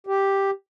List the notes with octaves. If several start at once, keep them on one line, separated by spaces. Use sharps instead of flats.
G4